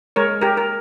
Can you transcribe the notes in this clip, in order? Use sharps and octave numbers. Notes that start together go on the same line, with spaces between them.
G#3 A#4 C#5
G4 A#4
A#4